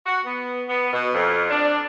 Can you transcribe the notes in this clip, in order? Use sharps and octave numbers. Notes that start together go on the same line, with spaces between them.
F#4
B3
B3
B2
F2
D4